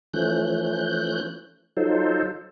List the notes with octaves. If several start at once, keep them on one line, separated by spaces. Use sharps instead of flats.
E3 F3 A3 C#4 F#6 G6
F#3 D#4 F4 A4 C5